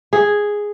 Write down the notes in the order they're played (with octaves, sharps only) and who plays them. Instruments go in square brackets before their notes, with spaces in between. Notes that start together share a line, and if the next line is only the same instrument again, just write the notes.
[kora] G#4